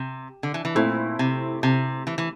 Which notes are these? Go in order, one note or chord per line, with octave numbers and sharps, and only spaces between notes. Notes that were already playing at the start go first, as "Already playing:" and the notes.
Already playing: C3
D3
E3
E3
A#2 A3 C4 E4
C3
C3
E3
E3